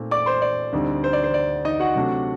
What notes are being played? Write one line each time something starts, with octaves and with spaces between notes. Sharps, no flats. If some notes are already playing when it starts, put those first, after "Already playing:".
Already playing: A#2 A3 C4 D#4
D5 D6
C5 C6
D5
D2 D3 G3 C4 D#4
C5
D5
C5
D5
D#4 D#5
F#4 F#5
C3 F#3 A3 D4